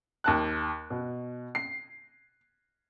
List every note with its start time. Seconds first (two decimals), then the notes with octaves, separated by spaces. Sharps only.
0.24 D#2 A5 F#6
0.90 B2
1.55 C7